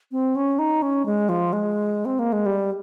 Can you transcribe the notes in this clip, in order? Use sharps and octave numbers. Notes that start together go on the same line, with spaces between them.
C4
C#4
D#4
C#4
G#3
F3
G#3
C4
A#3
G#3
G3